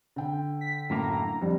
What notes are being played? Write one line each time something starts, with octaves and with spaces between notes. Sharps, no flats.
D3 G5
B6
F#2 A2 A#3 A#5
F2 G3